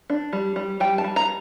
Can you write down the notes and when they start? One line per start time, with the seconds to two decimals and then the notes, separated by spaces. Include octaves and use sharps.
0.10 D4
0.33 G3
0.56 G3
0.80 G3 G5
0.98 A5
1.04 G3
1.16 A#5